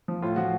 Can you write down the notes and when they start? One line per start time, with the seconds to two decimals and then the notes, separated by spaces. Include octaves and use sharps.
0.08 F3
0.22 A2 F4
0.36 F3 F#4